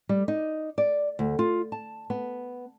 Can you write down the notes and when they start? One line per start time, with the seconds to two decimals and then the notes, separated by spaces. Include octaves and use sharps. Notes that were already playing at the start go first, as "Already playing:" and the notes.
0.09 G3
0.28 D#4
0.78 D5
1.19 D2
1.39 F4
1.72 A5
2.10 B3